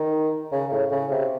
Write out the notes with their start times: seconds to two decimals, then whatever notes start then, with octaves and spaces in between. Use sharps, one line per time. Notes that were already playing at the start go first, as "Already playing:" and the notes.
Already playing: D#3
0.52 C#3
0.72 A2
0.92 C#3
1.11 C3